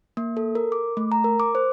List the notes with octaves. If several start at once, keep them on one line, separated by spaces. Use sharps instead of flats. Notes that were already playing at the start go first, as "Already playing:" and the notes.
A#3
A4
A#4
D6
A3
A#5
A#4
D6
C5